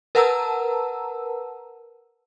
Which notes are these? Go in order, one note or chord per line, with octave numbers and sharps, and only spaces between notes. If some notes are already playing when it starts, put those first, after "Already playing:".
A#4 B4 F#5 A5 A#5 E6